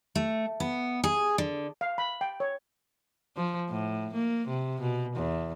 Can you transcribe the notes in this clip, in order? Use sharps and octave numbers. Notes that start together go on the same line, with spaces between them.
A3
B3
G#4
D3
F5
B5
G5
C#5
F3
A2
A#3
C3
B2
E2